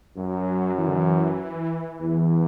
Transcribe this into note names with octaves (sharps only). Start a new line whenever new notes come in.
F#2 F#3
E3
D3
E3
E2